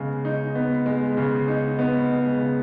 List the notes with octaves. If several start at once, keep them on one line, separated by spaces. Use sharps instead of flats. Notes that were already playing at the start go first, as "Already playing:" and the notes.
Already playing: C#3 G#3 B3
D#4
B3
G#3
C#3
D#4
B3
G#3
C#3